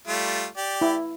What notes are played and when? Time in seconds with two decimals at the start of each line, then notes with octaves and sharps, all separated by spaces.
0.08 G3 A3 F4
0.57 G4 D5
0.81 E4